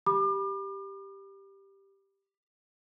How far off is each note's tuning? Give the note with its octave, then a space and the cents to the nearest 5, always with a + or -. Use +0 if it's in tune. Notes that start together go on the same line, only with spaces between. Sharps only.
G4 +0 B5 -20 D6 +40